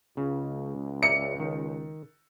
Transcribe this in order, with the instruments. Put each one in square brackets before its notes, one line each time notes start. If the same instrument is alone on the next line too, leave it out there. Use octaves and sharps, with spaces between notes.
[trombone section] C#2 [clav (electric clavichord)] C#3
[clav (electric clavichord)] D5 E5 [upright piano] C#7
[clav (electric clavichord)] D#3